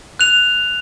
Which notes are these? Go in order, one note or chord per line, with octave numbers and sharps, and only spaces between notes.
F#6 F7